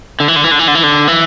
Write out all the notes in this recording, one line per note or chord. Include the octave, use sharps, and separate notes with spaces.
D3
E3
D3
E3
D3
E3
D3
E3
D3
E3